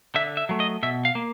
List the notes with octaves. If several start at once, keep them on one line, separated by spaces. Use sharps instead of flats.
D3 E5
E5
F#3 A3
D#5
B2 E5
F5
A#3